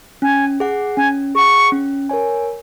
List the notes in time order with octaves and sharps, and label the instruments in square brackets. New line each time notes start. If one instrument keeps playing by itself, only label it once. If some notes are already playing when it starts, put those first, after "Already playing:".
[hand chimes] C#4 [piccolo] G#5
[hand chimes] G#4 F#5
[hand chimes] C#4 [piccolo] G#5
[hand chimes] G#4 F#5 [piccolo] C#6
[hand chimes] C#4
A#4 C#5 G#5